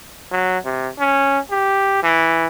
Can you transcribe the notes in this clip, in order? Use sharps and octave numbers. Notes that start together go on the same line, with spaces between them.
F#3
C3
C#4
G4
E3